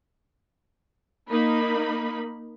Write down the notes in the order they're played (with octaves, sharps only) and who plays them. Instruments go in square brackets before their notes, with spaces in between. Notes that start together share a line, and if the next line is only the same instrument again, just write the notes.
[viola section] A#3 D#4 B5